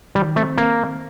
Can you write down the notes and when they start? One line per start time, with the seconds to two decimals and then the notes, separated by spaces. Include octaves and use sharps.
0.15 D#3 G3
0.36 A3 C4
0.58 A#3